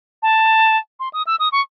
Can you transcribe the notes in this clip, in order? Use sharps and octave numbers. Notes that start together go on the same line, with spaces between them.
A5
C6
D#6
E6
D#6
C#6